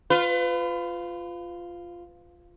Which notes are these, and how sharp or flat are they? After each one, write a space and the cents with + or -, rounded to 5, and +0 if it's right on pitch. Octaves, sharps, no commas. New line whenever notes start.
F4 +0 B4 +35